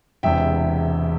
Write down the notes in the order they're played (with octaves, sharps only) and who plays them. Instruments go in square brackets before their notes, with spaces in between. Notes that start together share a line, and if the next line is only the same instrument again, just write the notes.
[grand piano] E1 E2 C3 E5 G5